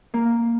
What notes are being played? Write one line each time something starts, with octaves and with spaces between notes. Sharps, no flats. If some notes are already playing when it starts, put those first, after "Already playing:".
A#3